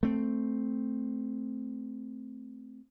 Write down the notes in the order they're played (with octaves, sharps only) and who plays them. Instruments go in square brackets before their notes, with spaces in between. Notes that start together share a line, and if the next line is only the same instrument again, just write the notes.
[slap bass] A3 C4